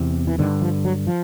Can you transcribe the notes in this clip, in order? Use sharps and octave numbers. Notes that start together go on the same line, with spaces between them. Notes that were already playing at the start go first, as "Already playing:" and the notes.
Already playing: E2 C3
E3
G2 D3 D#3
F3
F#3
F3